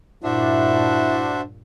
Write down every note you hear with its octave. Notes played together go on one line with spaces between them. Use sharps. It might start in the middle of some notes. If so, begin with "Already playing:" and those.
G2 A#2 D4 E4 F#4 C5 E5